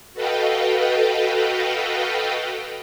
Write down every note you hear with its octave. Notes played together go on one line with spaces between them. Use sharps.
F#4 A4 B4 D#5 F5 G5